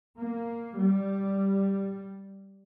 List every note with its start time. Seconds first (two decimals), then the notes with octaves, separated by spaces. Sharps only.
0.17 A#3
0.78 G3